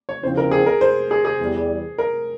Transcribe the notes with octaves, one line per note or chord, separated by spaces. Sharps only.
C#5
E2 C#3 F3 C4 C5
A#4
G#4
A#4
C5
G#4
G#4
E2 E3 G3
A#4